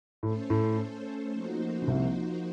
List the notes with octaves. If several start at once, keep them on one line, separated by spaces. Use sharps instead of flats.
A2 A3 C#4 A4 C5
A2
F3 A#3 D#4 F#4 C5
C#3
C2 C3